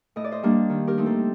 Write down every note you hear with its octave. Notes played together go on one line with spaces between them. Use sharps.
A2 D#5
D5
C5 D#5
G3 A#3 D4
D#3
G4 A#4
A3 C4 D#4
A4 C5